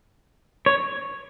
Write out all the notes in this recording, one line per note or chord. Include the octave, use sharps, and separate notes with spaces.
C#5